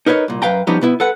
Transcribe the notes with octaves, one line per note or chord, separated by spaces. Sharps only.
D#4 A#4 B4 C#5 D#5
C2 A#2
F#2 B4 F5 G5 A#5
F3 G3 B3 C#4 D#4 G4
B2 B3 E4
A4 B4 F#5